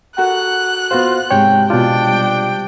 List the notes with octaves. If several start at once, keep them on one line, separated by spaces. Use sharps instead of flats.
F#4 A4 A#4 F#5 F#6
B3 F4 F#4 C5 F#5
G#2 C3 G#3 C#5 G5
B2 D4 F4 G5
G3